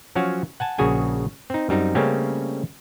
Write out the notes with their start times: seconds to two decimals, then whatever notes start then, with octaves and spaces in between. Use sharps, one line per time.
0.16 F3 F#3 C#4 F#4 F5
0.60 F#5 G#5 A5
0.78 A#1 C#3 F#4 G#4 G#5
1.50 C4 D#4
1.69 F#2 G3 C4 D#4
1.95 C#3 G3 A3 A#3 C4 C#4